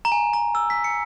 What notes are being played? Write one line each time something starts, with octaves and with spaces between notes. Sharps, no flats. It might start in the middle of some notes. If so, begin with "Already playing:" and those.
A#5
G#5
A#5
E6
B6
C#7